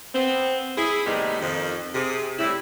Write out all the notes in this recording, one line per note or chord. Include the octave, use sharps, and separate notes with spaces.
B3 C4
E4 G#4
D#2 A2 C3 G3 B3 D#4
F2 D#3
C3 G#4
A2 C3 G3 E4